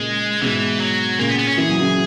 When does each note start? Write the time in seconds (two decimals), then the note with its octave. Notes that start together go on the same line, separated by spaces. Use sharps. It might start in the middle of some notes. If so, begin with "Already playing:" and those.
Already playing: A#2 C#3 G#3
0.41 G#2 B2 E3
0.80 F#3
1.18 A#2 C#3 A#3
1.29 B3
1.39 B3
1.48 C#4
1.58 E3 G#4
1.69 F#3
1.81 C#3 E3